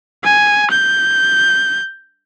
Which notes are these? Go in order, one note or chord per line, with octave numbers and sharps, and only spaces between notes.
G#5
G6